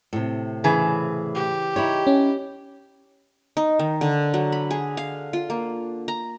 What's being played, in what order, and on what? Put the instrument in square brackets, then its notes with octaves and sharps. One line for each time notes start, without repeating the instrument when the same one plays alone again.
[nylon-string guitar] A2 C3
[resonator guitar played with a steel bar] C#3 E3 G#4
[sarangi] G4
[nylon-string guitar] D#4 E4 C#5
[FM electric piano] C#4
[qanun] D#4
D#3
D3
F#3
B5
G#4
F5
F4
A#3
A#5